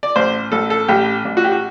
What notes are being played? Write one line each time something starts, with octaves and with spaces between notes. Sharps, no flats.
D5
A1 C5
A1 A4
A4
A1 G4
A1
F#4
G4
F#4